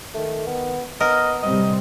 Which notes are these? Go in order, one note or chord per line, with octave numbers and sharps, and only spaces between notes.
D#3 A3
B3
B3 A#4 D#5
C3 G3 C4 D#5